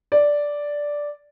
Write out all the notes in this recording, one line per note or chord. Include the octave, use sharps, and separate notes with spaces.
D5